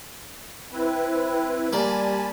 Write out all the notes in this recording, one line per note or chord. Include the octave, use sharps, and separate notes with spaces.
C4 E4 B4
G3 A#3 D5 G#5 A5 B5 C6